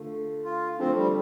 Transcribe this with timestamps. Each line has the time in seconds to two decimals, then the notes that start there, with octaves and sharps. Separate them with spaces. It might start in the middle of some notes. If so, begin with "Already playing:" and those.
Already playing: D3 A3 F4
0.44 F4
0.79 D3 F3 A3 C4
0.96 G3